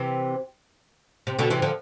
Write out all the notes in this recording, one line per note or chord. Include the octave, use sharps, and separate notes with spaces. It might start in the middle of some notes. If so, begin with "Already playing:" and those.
Already playing: C3 E3
C3
B2 D3
C3 E3
D3 F3